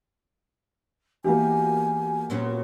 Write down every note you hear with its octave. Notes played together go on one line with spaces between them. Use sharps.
E2 E3 A#3 F#4 G4 G#5
A#2 F#3 B3 C#4